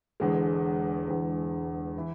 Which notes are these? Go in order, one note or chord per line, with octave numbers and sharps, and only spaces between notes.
E1 E2 D3 G#3
E1 E2 D3 G#3
E3